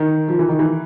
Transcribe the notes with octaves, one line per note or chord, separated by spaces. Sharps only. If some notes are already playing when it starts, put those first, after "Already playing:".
Already playing: D#3
F3
E3
D#3
E3